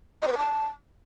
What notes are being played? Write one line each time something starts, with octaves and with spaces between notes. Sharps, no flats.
D#5
C5
B4
A5